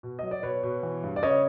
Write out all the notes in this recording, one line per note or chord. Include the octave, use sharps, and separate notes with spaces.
B2
F#3 D#5
D5
B2 B4 C#5
B2
E3
G2
D5
C#3 C#5 D#5